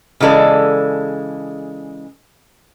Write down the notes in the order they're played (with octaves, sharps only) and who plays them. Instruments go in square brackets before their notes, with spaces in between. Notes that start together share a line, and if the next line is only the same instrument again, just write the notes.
[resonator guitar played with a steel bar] C#3 E3 G#3 A4 D5